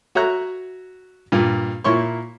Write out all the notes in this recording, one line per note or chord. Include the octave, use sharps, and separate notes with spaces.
F#4 C#5 E5 A#5 F#6
G2 A#2
A#2 A#3 E4 C#5 C6 C#6